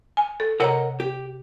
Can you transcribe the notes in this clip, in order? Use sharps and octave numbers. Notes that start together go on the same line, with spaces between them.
G#5
A4
C3 A#4 C#5 D#5 F#5 A#5
G4